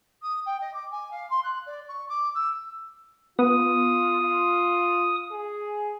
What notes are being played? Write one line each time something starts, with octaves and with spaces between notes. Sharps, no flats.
D#6
G5
D#5
D6
G#5
F5
C6
F#6
D5
C#6
D6
E6
B3 F4 D#6
F4
G#4